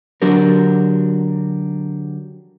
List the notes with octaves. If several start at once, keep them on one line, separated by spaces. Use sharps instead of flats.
D3 F#3 D4 F#4 G4 A#4